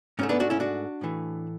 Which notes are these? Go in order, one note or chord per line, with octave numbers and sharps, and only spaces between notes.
G#2 F#3 A3 C#4
B3 D4
D4 F#4
C#4 E4
D4 F#4
A2 E3 A3